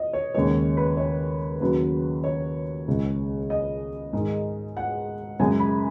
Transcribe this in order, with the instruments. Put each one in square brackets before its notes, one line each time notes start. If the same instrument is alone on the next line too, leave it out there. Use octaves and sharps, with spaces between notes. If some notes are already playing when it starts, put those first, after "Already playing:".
Already playing: [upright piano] D#5
C#5
D#2 C#3 G#3 C#5
B4
C#5
D#2 C#3 F#3 B4
C#5
C#2 C#3 G#3
D#5
G#2 D#3 G#3
F#5
F#2 C#3 G#3 G#5
B5